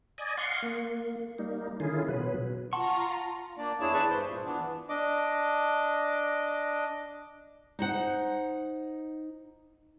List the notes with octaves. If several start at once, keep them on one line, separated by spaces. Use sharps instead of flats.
D5 D#5 G#5
F5 F#5 C6 C#6
A#3
G3 A#3 D#4
D3 D#3 C#4 E4 F4 G#4
B2 F#3 B4
F4 F#5 A5 A#5 C6 C#6
A#3 D4 D5
E2 D4 E4 G#4 C#5 A5
D4 G#4 B4 D5 A5 C#6
G2 C5 G6
A#2
E3 B3 D4
D4 D#5 D6
D#4 C5 F#5